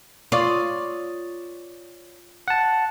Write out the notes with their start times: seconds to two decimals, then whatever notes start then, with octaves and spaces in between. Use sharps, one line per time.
0.32 F4 C#5 D5 D#6
2.48 F#5 A5